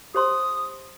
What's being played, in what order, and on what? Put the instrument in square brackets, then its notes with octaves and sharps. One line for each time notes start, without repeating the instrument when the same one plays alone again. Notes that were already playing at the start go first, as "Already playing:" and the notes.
[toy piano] G4 C5 C6 [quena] D#6